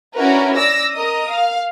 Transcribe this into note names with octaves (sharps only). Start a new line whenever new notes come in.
C#4 D4 E4 F#4 A#4 B4
D5 E6 A#6
A#4 D#5 D#6
F5